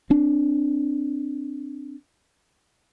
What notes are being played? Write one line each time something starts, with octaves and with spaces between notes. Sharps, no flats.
C4 D4